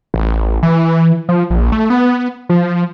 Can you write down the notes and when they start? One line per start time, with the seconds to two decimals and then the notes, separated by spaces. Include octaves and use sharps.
0.14 A1
0.63 E3
1.29 F3
1.50 A#1
1.72 A3
1.90 B3
2.49 F3